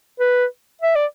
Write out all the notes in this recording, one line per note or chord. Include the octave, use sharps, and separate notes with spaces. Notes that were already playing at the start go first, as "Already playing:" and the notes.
B4
E5
D5